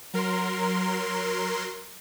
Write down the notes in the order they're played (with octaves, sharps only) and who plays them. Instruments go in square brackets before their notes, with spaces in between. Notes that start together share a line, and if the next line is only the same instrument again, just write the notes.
[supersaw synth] F#3 A#4 C6